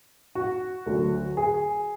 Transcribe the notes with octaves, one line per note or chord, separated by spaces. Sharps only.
F#4
D2 D3 F#3
G#4